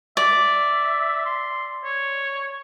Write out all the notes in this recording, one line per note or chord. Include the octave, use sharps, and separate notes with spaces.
D5 E5
C6
C#5